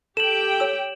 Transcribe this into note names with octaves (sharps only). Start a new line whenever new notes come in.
G4 A4 G5 E7 F#7
C#5 E6